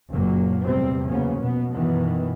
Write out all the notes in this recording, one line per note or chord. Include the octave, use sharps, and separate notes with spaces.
F#1 F#2 A#2 F#3 A#3
E2 A2 C3 G3 C4
C#3 F3 F#3 A#3 B3 C#4
B2 B3
F#2 B2 D#3 E3 B3